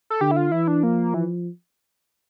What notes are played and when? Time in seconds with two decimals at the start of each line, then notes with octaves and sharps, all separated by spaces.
0.10 A4
0.21 D3 G4
0.31 E4
0.37 F4
0.52 E3 E4
0.68 D4
0.83 F3 A#3
1.14 E3